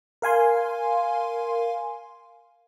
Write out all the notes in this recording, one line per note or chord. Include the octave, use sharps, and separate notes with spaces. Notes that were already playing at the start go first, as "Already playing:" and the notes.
A#4 F5 G#5 C6